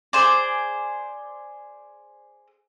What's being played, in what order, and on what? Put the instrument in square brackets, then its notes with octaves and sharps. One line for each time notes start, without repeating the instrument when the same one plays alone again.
[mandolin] G#4 C5 D5